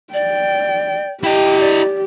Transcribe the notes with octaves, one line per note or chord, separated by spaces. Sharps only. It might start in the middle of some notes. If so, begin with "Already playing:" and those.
D5 G5
E4 G4 D#5 G5
D5